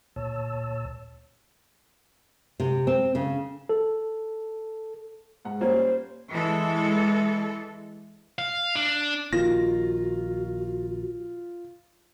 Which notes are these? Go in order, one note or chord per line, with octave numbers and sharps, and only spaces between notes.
D2 A#2 C#5 A5 E6
C3
C4
C#3
A4
G#2 F#5
G3 A#3 C#4 C5
E3 G#3 A4
F5
D4
A#1 D#3 F4 F#4 A#6